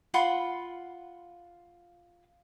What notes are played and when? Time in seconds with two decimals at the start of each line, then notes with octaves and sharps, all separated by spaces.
0.14 F4 F#5 B5 C6